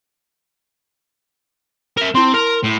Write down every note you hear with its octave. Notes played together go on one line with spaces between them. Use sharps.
A#4 E5
C4 E4 C6
A#4
A2